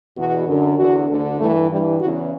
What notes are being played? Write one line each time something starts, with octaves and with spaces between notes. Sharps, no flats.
E2 B2 F#4
F#2 D3
E2 D3 F#4
D2 D3
G2 E3 A3
G2 E3 G3
E2 C#3 E3 F#4